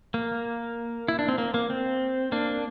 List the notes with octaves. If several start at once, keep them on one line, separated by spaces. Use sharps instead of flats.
A#3
E4
D4
C4
A#3
A#3
C4
A#3 D4